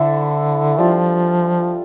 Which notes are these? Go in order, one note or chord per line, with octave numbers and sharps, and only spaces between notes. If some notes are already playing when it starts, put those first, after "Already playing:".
Already playing: D3 E4 A4 C5
F3 G3 D4 F4